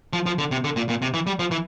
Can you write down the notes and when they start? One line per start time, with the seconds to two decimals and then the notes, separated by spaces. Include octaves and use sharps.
0.13 F3
0.26 F3
0.38 D3
0.51 C3
0.64 D3
0.76 A#2
0.89 A#2
1.02 C3
1.14 E3
1.27 G3
1.39 F3
1.51 E3